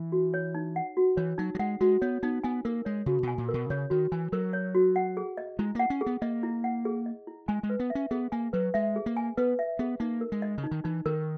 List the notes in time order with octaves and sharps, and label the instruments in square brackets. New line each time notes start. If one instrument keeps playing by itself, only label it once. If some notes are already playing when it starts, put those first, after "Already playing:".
Already playing: [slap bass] E3
[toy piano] F#4
C#5
D#4
F#5
F#4
[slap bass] E3 [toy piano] C#5
[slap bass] F#3 [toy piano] D#4
[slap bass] F#3
[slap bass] G#3 [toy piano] F#5
[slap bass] G#3 [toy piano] F#4
[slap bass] B3 [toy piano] C#5
[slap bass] B3 [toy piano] D#4
[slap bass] B3 [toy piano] G#5
[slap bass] A#3 [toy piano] A#4
[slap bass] G#3 [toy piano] C#5
[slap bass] C#3 [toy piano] F#4
[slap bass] B2 [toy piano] G#5
[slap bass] A#2
[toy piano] A#4
[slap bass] B2
[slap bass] C#3 [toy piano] C#5
[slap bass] D#3 [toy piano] F#4
[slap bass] E3 [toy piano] G#5
[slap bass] F#3 [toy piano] A#4
[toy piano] C#5
F#4
F#5
G#4
D#5
[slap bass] G#3 [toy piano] E4
[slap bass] A#3 [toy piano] F#5
[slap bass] C#4
[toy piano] G#4
[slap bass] B3
[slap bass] A#3 [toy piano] D#5
[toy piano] E4
F#5
G#4
D#5
E4
[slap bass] G#3 [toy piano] G#5
[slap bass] G#3
[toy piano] B4
[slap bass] B3
[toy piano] E5
[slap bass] C#4
[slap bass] B3 [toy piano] G#4
[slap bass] A#3 [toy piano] G#5
[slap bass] F#3 [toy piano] B4
[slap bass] G#3 [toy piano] E5
[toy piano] G#4
[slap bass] A#3
[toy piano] G#5
[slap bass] B3 [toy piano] B4
[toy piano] E5
[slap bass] B3 [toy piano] G#4
[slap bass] A#3 [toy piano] D#4
[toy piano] A#4
[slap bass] G#3
[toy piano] D#5
[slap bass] C#3
[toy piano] D#4
[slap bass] D#3
[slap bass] E3 [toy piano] D#4
[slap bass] D#3 [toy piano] A#4